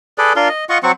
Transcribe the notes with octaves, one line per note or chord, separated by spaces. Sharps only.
G#4 A4 B4 D5
D4 F4 A#4 C6
D#5
F4 D#5 F#5 C#6
F#3 C4 F#5 C#6